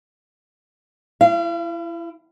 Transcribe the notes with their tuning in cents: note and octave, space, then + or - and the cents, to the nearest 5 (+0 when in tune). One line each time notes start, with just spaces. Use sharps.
E4 +25 F5 -40